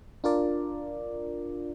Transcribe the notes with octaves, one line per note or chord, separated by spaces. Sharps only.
D4 F4 A#4 D5